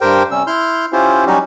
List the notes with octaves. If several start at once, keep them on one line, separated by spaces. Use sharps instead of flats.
G2 G4 A#4 C5 G5
C3 G3 C#4 E6
E4 C6 F6 G6
C#4 E4 F4 G4 C5
F#3 G3 C#4 D#4 F#4 G4